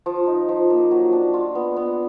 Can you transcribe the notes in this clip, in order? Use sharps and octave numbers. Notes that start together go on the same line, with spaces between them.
F3
D#4
F3
A#3
F#3
D4
F4
B3
B3